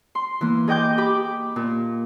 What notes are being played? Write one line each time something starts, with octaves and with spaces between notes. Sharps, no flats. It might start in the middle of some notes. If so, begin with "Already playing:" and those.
C6
E3 A#3
G#4 D#5 G5 D6 G6
G4 B5 D6
A#2